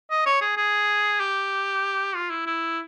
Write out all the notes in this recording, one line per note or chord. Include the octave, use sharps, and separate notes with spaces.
D#5
C#5
G#4
G#4
G4
F4
E4
E4